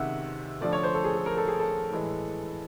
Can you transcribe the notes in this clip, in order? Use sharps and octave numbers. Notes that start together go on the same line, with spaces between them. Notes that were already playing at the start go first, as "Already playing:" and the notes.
Already playing: C3 D#3 G#3 C#4 E5 F#5
D3 F3 A3 D5
C#5
C5
A4
G#4
A4
A#4
A4
G#4
A4
A2 E3 G#3